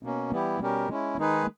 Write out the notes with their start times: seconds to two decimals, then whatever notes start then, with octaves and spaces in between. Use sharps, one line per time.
0.03 B2 A#3 C#4
0.31 E3 G3 B3 E4 G4
0.61 B2 G3 C#4 G4 A#4
0.89 G#3 C#4 E4
1.18 D#3 G#3 D#4 G#4 B4